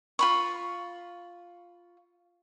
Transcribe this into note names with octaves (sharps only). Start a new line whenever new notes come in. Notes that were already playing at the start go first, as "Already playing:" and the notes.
F4 B5 C#6